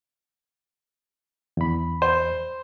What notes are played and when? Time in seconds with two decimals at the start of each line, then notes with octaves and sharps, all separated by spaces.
1.57 E2 B5
2.02 C5